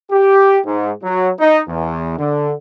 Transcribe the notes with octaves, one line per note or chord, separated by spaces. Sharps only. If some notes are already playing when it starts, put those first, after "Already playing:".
G4
G#2
F#3
D#4
E2
D3